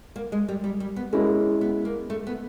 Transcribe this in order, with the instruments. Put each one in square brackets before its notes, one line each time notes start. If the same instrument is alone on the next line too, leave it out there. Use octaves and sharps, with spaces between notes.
[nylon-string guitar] A#3
G#3
G3
G3
G3
B3
[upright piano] G#3 C#4 E4 [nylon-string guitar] A#3
[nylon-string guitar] B3
A#3
A3
B3